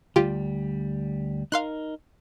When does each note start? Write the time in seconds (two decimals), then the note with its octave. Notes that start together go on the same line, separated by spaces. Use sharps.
0.16 D2 G3 F4 G4
1.52 D#4 A#4 F5 C6 F#6